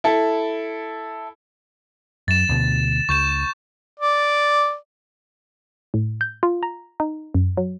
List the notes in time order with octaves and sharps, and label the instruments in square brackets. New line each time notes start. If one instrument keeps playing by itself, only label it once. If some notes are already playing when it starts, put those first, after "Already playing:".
[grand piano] E4 A4
[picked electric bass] F#2 [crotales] A6 E7
[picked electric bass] D2 B2
[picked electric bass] C#2 [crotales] C#6 G6 E7
[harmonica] D5
[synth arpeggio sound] A2
G6
F4
A#5
D#4
F#2
F#3